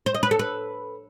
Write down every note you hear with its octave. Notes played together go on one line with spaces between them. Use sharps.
C5
D#5
B4
A4
B4